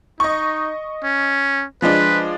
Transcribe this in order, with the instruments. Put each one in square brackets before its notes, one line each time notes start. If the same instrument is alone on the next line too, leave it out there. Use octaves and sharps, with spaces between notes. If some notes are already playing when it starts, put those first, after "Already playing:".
[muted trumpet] D#4 [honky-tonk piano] D#5 C#6
[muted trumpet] C#4
[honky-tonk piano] F3 G#3 D4 [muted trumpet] B4